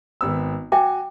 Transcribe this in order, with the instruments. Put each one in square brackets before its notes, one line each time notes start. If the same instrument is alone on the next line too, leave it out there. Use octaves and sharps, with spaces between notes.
[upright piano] G#1 B3 E6
[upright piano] F#4 G#5 [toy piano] E5 G5 D6